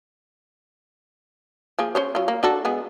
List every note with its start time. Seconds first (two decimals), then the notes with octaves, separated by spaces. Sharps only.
1.79 F3 A#3 G#4
1.95 C#4 C5 C#5
2.15 F#3 F4
2.28 A#3
2.43 D4 F#4 A4
2.65 G#3 B3 G#4